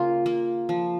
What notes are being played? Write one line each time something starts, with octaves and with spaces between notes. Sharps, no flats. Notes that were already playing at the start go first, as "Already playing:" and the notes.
Already playing: C#3 A#3 F4
A#3
F3